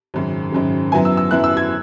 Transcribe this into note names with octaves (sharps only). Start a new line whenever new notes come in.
G#1 F#2 C#3
G#1 F#2 C#3
F#2 F#3 B3 E4 G#5
E6
E6
F#2 F#3 B3 E4 F#6
E6
G#6